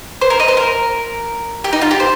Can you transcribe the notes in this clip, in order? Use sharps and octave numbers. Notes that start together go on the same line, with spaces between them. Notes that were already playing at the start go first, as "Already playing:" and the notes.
C5
A#4
D#5
C5
A#4
G4
D#4
F4
G4
C5